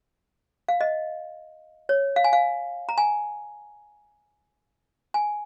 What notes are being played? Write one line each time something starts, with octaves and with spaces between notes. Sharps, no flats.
F5
D#5
C#5
F5
G#5
F5
A#5
G#5
G#5